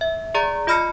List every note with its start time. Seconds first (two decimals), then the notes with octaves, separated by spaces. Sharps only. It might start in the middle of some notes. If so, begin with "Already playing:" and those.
0.01 E5
0.35 G#4 D5 A#5 A6
0.67 F4 D#5 B5 F6 A#6 C#7